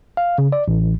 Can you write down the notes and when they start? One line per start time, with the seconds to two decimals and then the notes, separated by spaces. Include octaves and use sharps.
0.17 F5
0.38 C#3
0.52 D5
0.68 A1